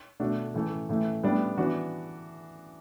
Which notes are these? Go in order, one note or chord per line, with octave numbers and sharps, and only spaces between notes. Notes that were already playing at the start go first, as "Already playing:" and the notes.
B2 A3 D4 F#4
A2 E3 A3
A2 E3 A3
A2 G3 B3 D4
E3 B3 D4 F#4